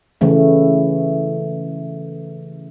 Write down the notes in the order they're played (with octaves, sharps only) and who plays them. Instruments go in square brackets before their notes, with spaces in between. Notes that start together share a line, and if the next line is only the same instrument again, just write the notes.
[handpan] C#3 E3 A3 C#4